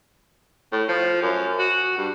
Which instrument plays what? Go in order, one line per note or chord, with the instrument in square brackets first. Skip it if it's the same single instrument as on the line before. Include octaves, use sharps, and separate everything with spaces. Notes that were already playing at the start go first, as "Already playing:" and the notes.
[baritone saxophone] A2
F3
F#2
F#4
G2